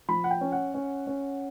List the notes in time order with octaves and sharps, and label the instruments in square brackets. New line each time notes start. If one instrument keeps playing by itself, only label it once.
[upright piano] F3 B5
F#5
G5
C#4
F#5
C#4
C#4